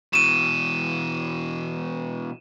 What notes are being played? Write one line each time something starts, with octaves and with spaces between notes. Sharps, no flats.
B2 E3 D#7 E7